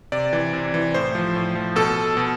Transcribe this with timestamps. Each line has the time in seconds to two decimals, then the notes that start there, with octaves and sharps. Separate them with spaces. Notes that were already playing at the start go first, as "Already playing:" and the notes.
0.12 C3 D5
0.33 E3
0.53 C3
0.74 E3
0.94 A2 C5
1.15 F3
1.36 A2
1.55 F3
1.76 B2 A4
2.17 B2